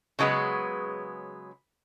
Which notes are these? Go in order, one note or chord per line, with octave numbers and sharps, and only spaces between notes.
C#3 F#3 G#3 B3 B4